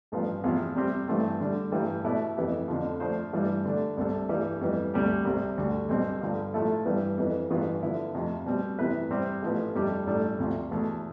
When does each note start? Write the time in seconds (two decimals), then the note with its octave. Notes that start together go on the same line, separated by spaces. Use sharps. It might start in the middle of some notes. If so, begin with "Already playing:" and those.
0.12 A1 G2 F3 B3
0.44 E2 C3 F3
0.75 C3 G3 C4 G4
1.08 G2 E3 A3 C4 G4
1.40 D3 G3 D4
1.72 G2 E3 G3
2.04 B2 A3 E4 B4 D5
2.36 F2 E3 B3 E4 G4
2.68 F2 D3 F3
3.00 F3 A3 D4 F4 C5
3.33 G2 E3 G3 D4
3.65 D3 A3 D4
3.97 C2 C3 G3 D4 A4
4.29 G2 E3 G3
4.61 F2 E3 G3 B3
4.94 D2 C3 G3 D4 G4
5.25 C2 C3 G3 C4
5.57 D2 D3 G3
5.89 B1 B2 G3 C4
6.21 G2 D3 F3
6.54 A2 F3 A3 E4 A4
6.85 G2 E3 G3 B3
7.18 F2 E3 B3
7.50 A1 G2 E3 B3 F4
7.82 D3 F3 B3 E4
8.14 F2 C3 F3 A3
8.46 B2 G3 C4
8.78 C3 E3 B3 E4 B4
9.10 C3 G3 C4 G4 C5
9.42 A1 A2 F3 B3
9.75 F2 C3 G3 D4 G4
10.07 A1 A2 G3 D4 A4
10.38 D2 C3 F3
10.71 E2 B2 A3